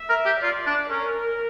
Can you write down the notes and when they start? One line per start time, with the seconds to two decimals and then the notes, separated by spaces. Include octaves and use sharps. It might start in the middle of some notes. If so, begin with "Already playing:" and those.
Already playing: E5
0.10 A#4
0.25 G4
0.42 F4 D5
0.67 D4
0.91 C#4 A#4